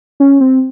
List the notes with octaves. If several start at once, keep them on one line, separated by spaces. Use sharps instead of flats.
C#4
C4